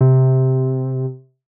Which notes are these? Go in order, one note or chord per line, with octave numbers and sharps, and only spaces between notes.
C3